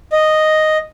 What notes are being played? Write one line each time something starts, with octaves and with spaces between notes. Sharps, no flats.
D#5